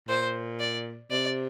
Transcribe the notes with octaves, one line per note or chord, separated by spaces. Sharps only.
A#2 C5
D5
C3 D5